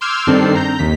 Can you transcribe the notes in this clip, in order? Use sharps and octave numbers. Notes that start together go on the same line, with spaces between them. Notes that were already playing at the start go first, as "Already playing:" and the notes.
C6 D6 E6 F6 G6 G#6
G2 D#3 C4 D4 A4 C7
A#5 G6
D#2 B6